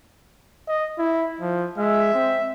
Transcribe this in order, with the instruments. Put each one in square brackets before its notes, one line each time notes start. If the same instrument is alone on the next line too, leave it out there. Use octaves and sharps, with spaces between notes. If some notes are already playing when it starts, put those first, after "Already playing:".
[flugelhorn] D#5
E4
F3
[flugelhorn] G#3 [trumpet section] E5
[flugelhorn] C4